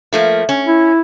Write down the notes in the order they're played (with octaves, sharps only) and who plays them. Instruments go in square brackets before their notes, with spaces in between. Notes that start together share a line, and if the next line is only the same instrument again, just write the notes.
[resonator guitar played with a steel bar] F3 A3 A#3
C#4
[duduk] E4